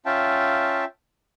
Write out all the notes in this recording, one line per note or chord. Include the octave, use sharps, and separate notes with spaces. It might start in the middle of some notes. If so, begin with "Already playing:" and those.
C#4 F4 E5 F5 G5 A5